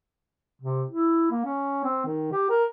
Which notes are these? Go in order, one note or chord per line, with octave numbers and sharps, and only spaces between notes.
C3
E4
A#3
C#4
C4
D#3
G4
A#4